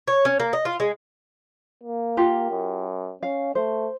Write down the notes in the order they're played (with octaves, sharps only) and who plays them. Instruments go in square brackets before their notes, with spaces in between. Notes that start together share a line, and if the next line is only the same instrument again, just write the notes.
[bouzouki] C#5
C#4
A#3
D#5
F4
G#3
[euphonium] A#3
[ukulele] F4 G4 A#4
[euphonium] F#2
[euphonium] C#4 [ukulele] F5
[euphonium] A3 [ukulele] C5